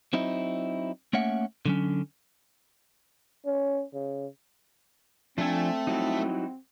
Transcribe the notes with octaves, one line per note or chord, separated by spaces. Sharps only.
F#3 C4 D#4 E4
A3 A#3 C#4 E5 F#5
D3 F#3 C#4
C#4
C#3
F3 A3 C4 D4 A4 G#5
F#3 G3 D#4 E4 F#4